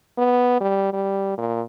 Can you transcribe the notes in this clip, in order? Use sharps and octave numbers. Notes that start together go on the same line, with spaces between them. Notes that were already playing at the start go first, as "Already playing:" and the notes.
B3
G3
G3
A#2